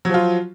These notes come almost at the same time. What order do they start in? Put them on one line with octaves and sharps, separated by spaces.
F#3 F3 F4